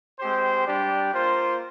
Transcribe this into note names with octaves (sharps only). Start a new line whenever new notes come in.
G#3 C4 G4 C5
G3 D4 G4 D5
A#3 F4 C5